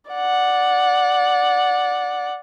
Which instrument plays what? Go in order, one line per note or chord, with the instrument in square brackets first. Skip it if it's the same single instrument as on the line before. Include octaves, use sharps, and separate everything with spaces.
[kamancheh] D5 F#5